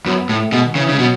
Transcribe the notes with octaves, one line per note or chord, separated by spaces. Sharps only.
F#2 B3
A2 A3
B2 G#3
D#3
C#3 E3
C#3 G#3
B2 F#3